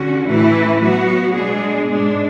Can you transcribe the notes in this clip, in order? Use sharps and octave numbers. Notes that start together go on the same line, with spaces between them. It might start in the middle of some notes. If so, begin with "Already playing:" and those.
Already playing: D3 C#4 F#4
A2 E3 A3 E4 B4
F#3 B3 F#4
B2 G#3 D4 G#4
G#2 G#3 D4